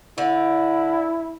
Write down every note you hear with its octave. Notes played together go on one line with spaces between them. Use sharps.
D3 E4